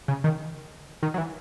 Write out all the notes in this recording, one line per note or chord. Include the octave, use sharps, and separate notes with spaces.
C#3
D#3
D#3
F#3
E3